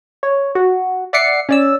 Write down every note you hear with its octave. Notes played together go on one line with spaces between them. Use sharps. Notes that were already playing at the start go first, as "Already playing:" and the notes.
C#5
F#4
D5 E5 F#5 D6 C7 C#7
C#4 D5 E6